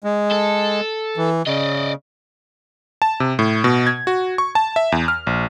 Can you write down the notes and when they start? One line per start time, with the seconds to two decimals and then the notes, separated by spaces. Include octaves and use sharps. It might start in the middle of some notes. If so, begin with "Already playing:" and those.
0.04 G#3
0.31 A4
1.17 E3
1.47 C#3 D5 D#5
3.02 A5
3.20 C3
3.39 A2
3.64 B2
3.87 G#6
4.07 F#4
4.38 C#6
4.55 A5
4.76 E5
4.92 E2
5.08 F6
5.27 A#1